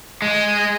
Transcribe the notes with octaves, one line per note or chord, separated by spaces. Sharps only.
G#3